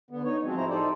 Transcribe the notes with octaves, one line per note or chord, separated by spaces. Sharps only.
D3 B3
D#4 C#5
F3 F#3 G#3 C4
A2 F3 E4 C5 A#5
D#4 G4 A4 C5 D5